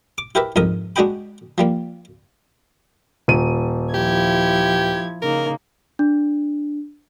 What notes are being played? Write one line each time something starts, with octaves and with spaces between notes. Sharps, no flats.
D6
E4 G4 A#4 B4 E5
C2 F2 G#2 A#4 D#6
G#3 D4 F#4 D#5 G5 B5
F3 G3 A#3
D#1 D#7
F3 E4 G4 G#6
C#3 A#3 D#4 A#4
D4